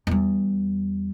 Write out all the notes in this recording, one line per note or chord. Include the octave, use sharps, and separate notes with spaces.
E2 G3